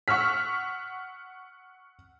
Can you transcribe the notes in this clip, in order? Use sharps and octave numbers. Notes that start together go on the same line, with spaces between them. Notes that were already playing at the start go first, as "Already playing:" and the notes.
F#5 C#6 E6 F6 B6